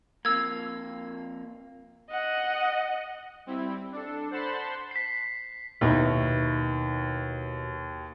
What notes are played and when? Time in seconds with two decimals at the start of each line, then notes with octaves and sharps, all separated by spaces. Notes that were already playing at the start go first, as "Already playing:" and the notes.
0.25 F2 A#3 E6 G#6
2.10 D#5 F#5
3.46 G3 C4 E4
3.92 D4 A4
4.31 C5 F#5 A5 B5 C6
4.91 B6 C7
5.81 D#2 B2 D#4 E4